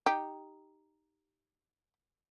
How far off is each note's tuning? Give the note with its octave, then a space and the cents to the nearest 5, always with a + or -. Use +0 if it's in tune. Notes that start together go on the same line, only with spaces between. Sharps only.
D#4 +0 G4 +0